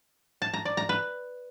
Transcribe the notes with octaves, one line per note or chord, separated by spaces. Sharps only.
A5
A#5
D5
A#5
B4